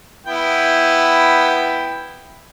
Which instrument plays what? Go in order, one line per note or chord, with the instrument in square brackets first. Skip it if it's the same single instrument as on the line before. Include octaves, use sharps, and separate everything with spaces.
[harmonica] B3 E4 G5